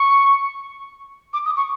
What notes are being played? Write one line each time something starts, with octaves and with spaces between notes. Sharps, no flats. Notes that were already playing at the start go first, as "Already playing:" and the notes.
Already playing: C#6
D6
D#6
C#6